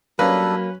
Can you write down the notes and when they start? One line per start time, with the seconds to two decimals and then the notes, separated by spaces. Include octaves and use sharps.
0.19 F#3 G3 A#3 C#4 D4 A4 B4